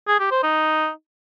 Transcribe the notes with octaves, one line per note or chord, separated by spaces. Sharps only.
G#4
G4
C5
D#4